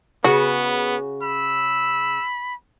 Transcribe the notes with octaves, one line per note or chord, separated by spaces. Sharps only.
C#3 B3 F#4
B5 E6